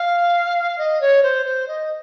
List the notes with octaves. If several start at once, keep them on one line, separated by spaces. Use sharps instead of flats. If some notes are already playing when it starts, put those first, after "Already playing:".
Already playing: F5
D#5
C#5
C5
C5
D#5